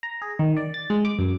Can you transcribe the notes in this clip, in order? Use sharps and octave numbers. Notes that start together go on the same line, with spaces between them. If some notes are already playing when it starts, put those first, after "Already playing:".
A#5
G#4
D#3
D5
A6
G#3
D6
F#2